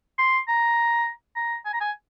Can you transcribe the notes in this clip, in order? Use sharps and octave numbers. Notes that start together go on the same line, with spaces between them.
C6
A#5
A#5
G#5
A#5
G#5